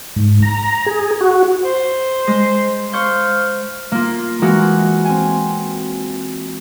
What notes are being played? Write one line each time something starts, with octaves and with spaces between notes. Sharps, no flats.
G#2
A#5
G#4
F#4
C5
G#3
C5 F5 C#6 G6
A#3 F4
E3 G#3 A#3 F#4
C4 G#5